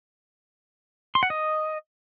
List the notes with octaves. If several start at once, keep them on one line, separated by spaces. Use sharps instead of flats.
C6
F#5
D#5